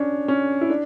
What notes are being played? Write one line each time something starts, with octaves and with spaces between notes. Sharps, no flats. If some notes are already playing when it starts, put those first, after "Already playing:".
Already playing: C#4 D4
C#4
E4
D4